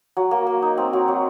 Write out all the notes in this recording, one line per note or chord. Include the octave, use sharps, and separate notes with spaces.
F#3
A#3
A#3
D#4
C4
F#3
F#3